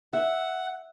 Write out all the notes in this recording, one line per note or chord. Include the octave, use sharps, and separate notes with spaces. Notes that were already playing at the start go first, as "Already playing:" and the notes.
E5 F#5